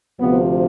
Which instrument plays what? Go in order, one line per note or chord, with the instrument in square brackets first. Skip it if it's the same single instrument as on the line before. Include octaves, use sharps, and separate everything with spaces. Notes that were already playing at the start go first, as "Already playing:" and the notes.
[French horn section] D2 C3 F3 B3